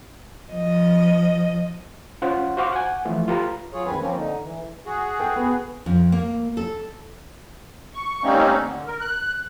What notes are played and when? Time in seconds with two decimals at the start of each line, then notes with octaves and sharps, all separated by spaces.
0.51 F3 D#5
2.22 C#4 F4 C5 F5 F#5
2.57 F#4 C5 F5 C#6 D6
2.73 F#5 G#5
3.05 E3 F3 A3 F4
3.28 F4 G4 A4 B4 A#5
3.73 F#3 F4 G#4 C#5
3.86 D2 G2 D#3 C4 B4 G#5
3.99 F3 A#3 C4 C#4
4.15 D3 D#4
4.42 E3
4.86 F#4 G#4
5.20 A4 G5
5.36 B3
5.86 F2
6.12 A#3
6.57 A4
7.94 C#6
8.23 G3 A3 A#3 C4 C#4 D#4
8.59 D3
8.87 A#4
9.00 F#6